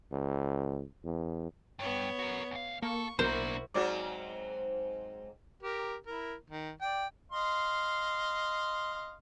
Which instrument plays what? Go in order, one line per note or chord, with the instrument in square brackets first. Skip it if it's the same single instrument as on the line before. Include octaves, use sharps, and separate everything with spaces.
[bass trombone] C#2
E2
[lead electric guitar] G2 [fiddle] B3 C#5
[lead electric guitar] F#4 A#4
D2 F5
[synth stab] A#3 [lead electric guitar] A4 [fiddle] C#6
[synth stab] B1 B2 A#4 [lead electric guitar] A#3 D4 [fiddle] E4 F#4 [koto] C5
[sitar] G#2 F#3 C4 [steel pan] F#4 D5 D6
[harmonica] G4 A#4
E4 A#4
D#3
D5 G5
D#5 F5 C6